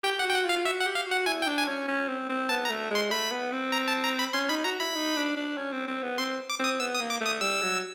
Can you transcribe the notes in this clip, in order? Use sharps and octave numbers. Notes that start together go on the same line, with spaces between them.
G4 G5
F#5
F#4
G5
F#5
F4
F5
F4
F#4 E5
F#5
G4
F5
F#4
F#5
E4 G#5
G5
D4
G#5
C#4
C#4
C4
C4
B3 A5
A#5
A3
G#3 C6
A3 B5
B3
C4
A#5
A5
A#5
B5
C#4 C6
D#4 B5
F#4 A#5
E4 B5
D#4
D4
D4
C#4
C4
C4
B3
C4 C6
D6
C4 D#6
B3 E6
D#6
A#3
D6
A3
D#6
G3 E6
F#3